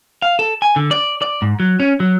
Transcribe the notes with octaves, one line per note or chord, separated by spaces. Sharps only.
F5
A4
G#5
D3
D5
D5
G#2
F#3
C#4
F#3